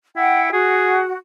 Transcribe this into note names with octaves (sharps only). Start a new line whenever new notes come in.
E4 F#5 G5
F#4 G#4